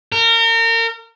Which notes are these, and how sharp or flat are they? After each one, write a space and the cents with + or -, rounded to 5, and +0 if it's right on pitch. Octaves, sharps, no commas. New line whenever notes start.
A#4 -30